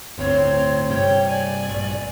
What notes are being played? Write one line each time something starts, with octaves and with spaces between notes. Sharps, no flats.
G1 D2 A2 C4 C5 C#5
G2 C3 G3 C#5 G5
D5 G#5
A#1 G2